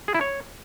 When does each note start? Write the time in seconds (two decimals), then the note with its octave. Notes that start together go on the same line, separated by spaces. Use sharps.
0.08 G#4
0.14 E4
0.21 C#5